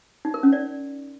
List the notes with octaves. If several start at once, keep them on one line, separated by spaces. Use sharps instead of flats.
D#4
A#4
C#4
D5